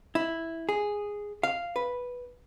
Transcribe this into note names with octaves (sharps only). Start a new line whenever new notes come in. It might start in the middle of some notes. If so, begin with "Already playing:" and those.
E4
G#4
F5
B4